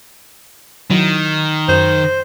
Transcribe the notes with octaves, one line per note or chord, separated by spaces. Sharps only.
D#3 F#3 E4
F#2 C5